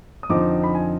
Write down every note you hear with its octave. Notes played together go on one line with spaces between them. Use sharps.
D#6
F2 D3 F3 C4 D#4 D6
B5
G#5